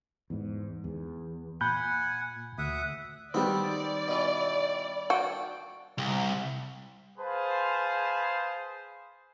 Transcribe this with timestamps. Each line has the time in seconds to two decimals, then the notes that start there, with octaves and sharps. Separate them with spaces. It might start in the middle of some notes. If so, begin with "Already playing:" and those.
0.30 E2 G#2
0.84 E2
1.61 A#2 F#5 G#5 B5 F#6 G6
2.58 D2 E5 F#5 D#6
3.34 D#3 G3 B3 C4 D5
4.08 B2 E3
5.10 F#4 G5
5.98 C2
7.19 G#4 B4 C5 F5 A5